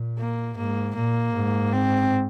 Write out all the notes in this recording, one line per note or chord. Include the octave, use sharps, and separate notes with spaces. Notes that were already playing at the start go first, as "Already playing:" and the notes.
Already playing: A#2
A#3
G#2 A#3
A#2 A#3
G#2
C4